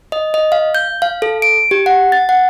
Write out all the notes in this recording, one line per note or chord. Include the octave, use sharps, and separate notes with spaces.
D#5
D#5
F5
G6
F5
A4
D7
G4
F#5
A6
F#5